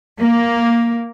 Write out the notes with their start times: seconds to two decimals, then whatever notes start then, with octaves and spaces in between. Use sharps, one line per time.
0.18 A#3